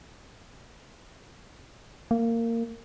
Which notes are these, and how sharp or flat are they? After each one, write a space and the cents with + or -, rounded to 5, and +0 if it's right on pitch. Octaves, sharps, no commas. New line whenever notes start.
A#3 -20